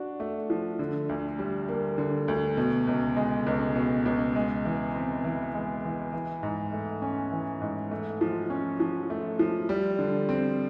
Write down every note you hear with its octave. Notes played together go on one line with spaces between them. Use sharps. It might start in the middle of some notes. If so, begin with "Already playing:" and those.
Already playing: D4 F#4
A3
F3
D3
D2
G3
A#3
D3
D2
B2
C#2
G#3
C#2
B2
C#2
G#3
E3
C4
E3
G#3
E3
E3
G#2
A3
C#4
E3
G#2
A3
F3
C#4
F3
A3
F3
G3
D3
C4